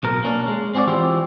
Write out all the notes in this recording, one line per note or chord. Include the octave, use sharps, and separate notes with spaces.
B1 B2 A#4
A#3 C#4 D4
G#3
C4 C#4 F#4 C5 D5
E3 E4 F4 G4 C5